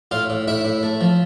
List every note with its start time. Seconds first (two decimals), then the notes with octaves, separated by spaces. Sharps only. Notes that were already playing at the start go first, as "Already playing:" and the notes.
0.11 A2 F4 F5
0.30 A2
0.47 A2 E4 E5
0.65 A2
0.83 A3
1.01 F3